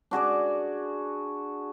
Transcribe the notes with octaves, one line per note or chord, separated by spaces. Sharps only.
D4 F#4 G#4 D5